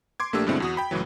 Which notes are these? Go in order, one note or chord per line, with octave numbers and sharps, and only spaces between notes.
C6 D6 G#6
A#1 A3 A#3 D4 G4 E6
G2 B2 D3 G#3 C4 E4
E2 F#4 D#6
G5 B5
C#2 A2 E3 F#3